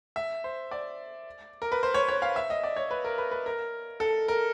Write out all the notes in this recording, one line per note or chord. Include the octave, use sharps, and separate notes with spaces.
E5
C5
D5
A#4
B4
C5
C#5
C#5
F5
E5
D#5
D5
C#5
B4
A#4
B4
B4
A#4
A4
A#4